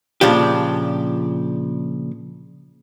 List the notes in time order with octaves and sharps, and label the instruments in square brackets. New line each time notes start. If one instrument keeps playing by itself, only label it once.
[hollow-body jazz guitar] A#2 C#3 F3 D4 G4